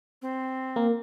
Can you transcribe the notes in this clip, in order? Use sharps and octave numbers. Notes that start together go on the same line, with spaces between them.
C4
A#3